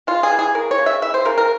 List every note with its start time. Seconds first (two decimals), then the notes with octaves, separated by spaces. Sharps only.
0.07 C#3 F4
0.23 G#4
0.31 E3
0.39 G#4
0.55 C#3 A#4
0.71 C#5
0.79 C#3
0.86 E5
1.02 E3 E5
1.14 C5
1.25 C#3 A#4
1.38 A#4